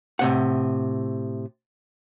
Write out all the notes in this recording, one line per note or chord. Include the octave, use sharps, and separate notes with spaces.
A2 C3 F#5